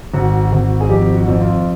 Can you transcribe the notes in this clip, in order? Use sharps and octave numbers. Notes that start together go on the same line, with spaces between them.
G#1 F#4
G#1
G#4
F2 G4
F#4
F2
F4